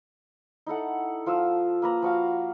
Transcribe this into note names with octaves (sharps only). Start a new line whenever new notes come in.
D#4 E4 A4 F#5
F3 F4 F5 E6
A#3 B4 A#5
F3 F#4 F5